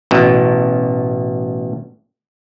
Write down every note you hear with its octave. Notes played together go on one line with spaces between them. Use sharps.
A1 B2